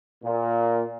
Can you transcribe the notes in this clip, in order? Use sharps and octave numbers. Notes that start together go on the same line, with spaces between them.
A#2